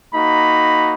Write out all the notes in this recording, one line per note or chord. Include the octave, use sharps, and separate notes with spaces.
A#3 D#4 F#4 B5